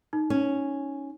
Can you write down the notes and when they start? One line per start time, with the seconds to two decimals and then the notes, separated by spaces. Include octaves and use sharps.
0.13 D#4
0.30 C#4